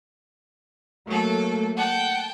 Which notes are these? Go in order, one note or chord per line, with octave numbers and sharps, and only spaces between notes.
F#3 A3 A#3 A4
F#5 G5 A5